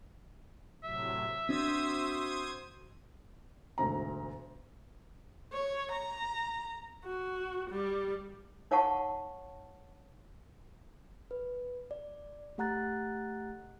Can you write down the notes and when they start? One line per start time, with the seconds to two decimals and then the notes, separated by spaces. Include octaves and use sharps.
0.84 A2 C3 F#3 E5
1.49 C4 D4 F#4 C5 D#6 G#6
3.78 E1 D2 G#2 A#5
5.53 C#5
5.92 A#5
7.05 F#4
7.70 G3
8.71 D#4 C#5 F5 F#5 A5 C#6
11.31 B4
11.91 D5
12.58 A3 G4 F#5 A#5 F#6 A6